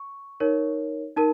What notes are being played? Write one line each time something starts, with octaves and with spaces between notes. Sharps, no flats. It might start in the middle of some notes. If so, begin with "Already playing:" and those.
Already playing: C#6
D#4 A#4 C#5
D#4 A#4 A5